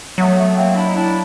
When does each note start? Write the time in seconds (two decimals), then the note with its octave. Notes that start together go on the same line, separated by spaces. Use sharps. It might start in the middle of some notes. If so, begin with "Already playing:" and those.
0.18 F#3 A3 B3
0.37 A3 B3
0.57 A#3 C4
0.75 D4 E4
0.86 D#4
0.94 D4 E4